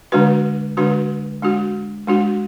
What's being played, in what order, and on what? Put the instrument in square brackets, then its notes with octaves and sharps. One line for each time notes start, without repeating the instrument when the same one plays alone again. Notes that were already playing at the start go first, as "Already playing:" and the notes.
[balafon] D3 G#3 D4 F#4 B4
D3 G#3 D4 F#4 B4
G#3 D4 F#4
G#3 D4 F#4